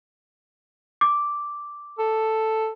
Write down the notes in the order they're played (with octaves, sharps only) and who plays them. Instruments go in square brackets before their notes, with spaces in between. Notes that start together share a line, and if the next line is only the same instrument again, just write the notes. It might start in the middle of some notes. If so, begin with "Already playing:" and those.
[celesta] D6
[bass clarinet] A4